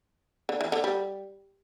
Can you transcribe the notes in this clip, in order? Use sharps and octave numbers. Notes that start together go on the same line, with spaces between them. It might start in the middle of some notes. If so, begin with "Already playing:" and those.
D3
E3
D3
G3